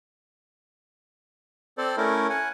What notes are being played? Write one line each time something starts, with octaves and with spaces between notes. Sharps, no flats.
C4 A4 C5 D5
A3 C#4 E4 A#4
F#5 G#5